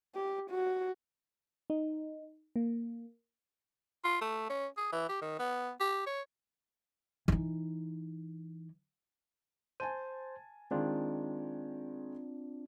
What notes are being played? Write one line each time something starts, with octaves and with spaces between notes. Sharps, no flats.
G4
F#4
D#4
A#3
F4
A3
C#4
G#4
E3
G4
D#3
B3
G4
C#5
E3 D#4
C5 G#5 A5 D#7
D#3 G#3 C4 D4 F4